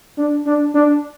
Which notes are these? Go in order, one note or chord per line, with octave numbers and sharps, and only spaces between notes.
D4
D4
D4